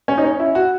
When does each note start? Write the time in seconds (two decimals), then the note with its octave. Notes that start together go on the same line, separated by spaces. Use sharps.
0.08 C#4
0.18 D#4
0.24 C#4
0.40 E4
0.55 F#4